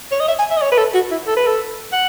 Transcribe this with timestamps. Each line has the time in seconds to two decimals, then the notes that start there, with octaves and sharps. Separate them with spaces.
0.11 C#5
0.20 D#5
0.28 E5
0.39 G#5
0.51 E5
0.57 D#5
0.62 C#5
0.72 B4
0.78 A4
0.94 F#4
1.11 E4
1.27 A4
1.37 B4
1.47 A4
1.93 F#5